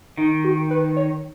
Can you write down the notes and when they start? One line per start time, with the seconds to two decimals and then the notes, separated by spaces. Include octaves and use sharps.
0.17 D#3 D#4
0.45 F#4
0.70 B4
0.96 C#5